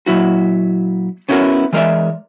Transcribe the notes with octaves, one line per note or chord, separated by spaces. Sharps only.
A#2 F#3 E4 F#4
B3 C#4 E4 F#4 G4 A#4
E3 G#3 A#4 C#5 D5 E5